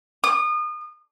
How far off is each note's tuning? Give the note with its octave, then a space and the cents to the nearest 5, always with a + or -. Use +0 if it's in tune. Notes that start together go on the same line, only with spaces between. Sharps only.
D#6 -35